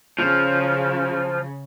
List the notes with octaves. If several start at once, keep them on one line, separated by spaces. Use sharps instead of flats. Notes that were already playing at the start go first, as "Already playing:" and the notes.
C#3 F3